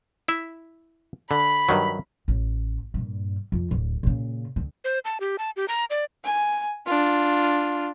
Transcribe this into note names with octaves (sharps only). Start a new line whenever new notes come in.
E4 E5
D3 B5
G2 D#3 F#3
A1
G2 A#2
F2
D1
A#2 C#3
D2
C5
A5
G4
A5
G4
A#5
D5
G#5
D4 F4